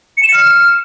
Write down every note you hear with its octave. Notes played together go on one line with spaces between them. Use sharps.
C#7
E7
C#7
F6